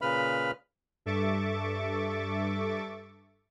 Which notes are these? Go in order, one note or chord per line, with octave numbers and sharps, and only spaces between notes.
A#2 C#3 B4 B5 F6
G2 A4 E5 C#6 D6 A6